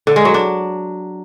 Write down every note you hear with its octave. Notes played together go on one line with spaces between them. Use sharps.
D3
G#3
F#3
D4